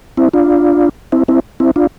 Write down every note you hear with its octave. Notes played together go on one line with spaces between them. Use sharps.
C4 E4
D4 F4
C4 E4
C4 E4
C4 E4
D4 F4